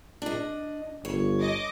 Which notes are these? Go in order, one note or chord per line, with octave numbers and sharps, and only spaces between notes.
D4 D#5
G1 C#5
D#5 D6